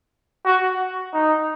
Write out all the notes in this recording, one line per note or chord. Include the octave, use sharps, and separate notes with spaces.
F#4
D#4